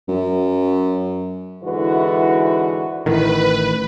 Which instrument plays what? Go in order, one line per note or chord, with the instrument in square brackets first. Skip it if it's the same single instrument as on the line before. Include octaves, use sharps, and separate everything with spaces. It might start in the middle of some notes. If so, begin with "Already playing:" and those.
[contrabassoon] F#2
[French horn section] G#2 D3 E3 E4 F#4 B4
[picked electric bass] A1 A2 D#3 [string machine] B4